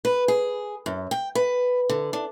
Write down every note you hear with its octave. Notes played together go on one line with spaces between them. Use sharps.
B4
G#4
F#2
G5
B4
D3
D4